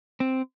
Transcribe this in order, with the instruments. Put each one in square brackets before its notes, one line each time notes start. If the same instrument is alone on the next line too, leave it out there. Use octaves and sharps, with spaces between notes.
[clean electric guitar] C4